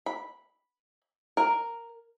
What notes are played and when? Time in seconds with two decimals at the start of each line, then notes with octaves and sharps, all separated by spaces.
0.06 B5
1.37 A#4